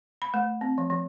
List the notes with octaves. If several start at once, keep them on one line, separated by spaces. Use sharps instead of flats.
B5
A3
C4
F3
F3